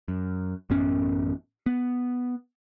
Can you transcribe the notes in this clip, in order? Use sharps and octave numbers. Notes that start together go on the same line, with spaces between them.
F#2
A1 F#2 B3 C#4
B3